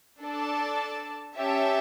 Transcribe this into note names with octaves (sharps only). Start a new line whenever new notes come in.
D4 A4 D5 A5
C#4 G4 C#5 E5 A5